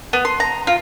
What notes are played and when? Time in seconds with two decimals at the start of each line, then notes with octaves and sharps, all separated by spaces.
0.13 B3
0.25 C6
0.40 A#5
0.67 F4